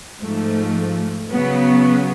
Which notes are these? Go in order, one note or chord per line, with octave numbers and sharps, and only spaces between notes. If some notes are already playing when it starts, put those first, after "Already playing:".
G#2 F3 A3
C#3 F#3 B3